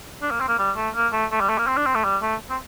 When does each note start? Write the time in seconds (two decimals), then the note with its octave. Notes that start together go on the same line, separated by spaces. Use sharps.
0.22 D4
0.31 A#3
0.40 C4
0.48 A#3
0.59 G3
0.77 A3
0.95 A#3
1.13 A3
1.32 A3
1.40 G3
1.49 A3
1.58 A#3
1.67 C4
1.77 D4
1.86 C4
1.95 A3
2.04 G3
2.22 A3
2.50 C4